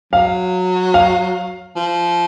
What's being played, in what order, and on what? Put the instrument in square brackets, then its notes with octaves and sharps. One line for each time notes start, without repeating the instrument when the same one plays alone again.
[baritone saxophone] F#3 [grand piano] F5
[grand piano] F5
[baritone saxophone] F3